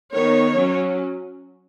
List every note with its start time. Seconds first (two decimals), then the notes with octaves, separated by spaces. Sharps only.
0.13 D#3 B3 C#5
0.56 F#3 C#4